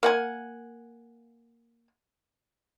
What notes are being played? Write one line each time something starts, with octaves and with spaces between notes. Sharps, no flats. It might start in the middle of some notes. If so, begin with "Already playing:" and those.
A#3 F#5 G#5